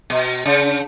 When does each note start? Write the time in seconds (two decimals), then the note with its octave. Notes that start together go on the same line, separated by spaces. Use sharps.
0.10 B2
0.46 C#3